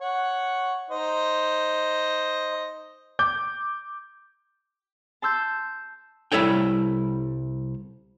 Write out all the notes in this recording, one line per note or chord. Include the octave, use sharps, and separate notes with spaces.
C#5 F#5
D#4 C5 D#5
D6 G6
A5 C6 E6 G6
C2 G3 E4 A4 C#5 G5